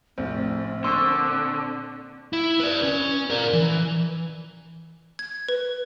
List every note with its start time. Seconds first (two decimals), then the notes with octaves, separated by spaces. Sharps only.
0.18 A#1 A2 C3 C4 C5
0.84 A#2 D3 C6 C#6 E6
2.33 E4
2.60 B4 D5
2.84 C#4
3.30 A#4 D5
3.53 E3
5.19 G#6
5.49 B4